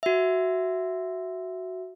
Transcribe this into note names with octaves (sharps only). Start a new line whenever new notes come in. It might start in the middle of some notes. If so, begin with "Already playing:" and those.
F#4 E5